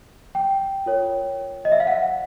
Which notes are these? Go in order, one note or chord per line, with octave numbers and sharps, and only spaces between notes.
G5
F4 A#4 C#5
D#5
E5
F5
F#5